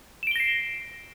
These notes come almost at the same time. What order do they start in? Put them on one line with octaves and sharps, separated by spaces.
E7 D7 G7 A#6 C7